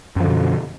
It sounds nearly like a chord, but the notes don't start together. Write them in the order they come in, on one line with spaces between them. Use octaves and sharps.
F#2 F3 D3 B2